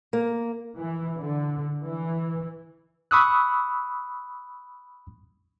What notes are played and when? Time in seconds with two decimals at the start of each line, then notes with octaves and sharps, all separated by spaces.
0.13 A#3
0.77 E3
1.17 D3
1.84 E3
3.11 B5 C#6 D#6 E6 F#6